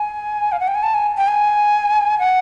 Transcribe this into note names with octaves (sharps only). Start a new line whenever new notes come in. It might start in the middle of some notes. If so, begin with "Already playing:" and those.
Already playing: G#5
F5
F#5
G5
G#5
A5
G#5
G5
G#5
F#5